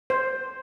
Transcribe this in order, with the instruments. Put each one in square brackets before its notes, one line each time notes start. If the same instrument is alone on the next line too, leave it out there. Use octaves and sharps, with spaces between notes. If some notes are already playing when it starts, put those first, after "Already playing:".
[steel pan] C5